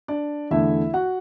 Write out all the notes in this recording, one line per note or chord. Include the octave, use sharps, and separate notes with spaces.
D4 D5
E2 D3 A3 E4 E5
F#4 F#5